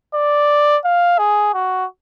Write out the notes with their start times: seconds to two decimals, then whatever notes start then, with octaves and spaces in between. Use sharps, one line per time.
0.14 D5
0.84 F5
1.18 G#4
1.54 F#4